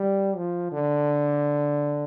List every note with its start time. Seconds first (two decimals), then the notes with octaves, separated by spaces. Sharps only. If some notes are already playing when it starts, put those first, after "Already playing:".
Already playing: G3
0.36 F3
0.72 D3